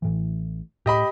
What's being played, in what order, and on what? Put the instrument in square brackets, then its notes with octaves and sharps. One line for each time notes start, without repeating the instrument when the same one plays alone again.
[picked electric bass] A1 A2 E3
[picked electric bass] A2 [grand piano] G4 D#5 B5